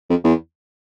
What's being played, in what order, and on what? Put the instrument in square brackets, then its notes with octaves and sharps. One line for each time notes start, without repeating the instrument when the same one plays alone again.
[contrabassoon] F2
E2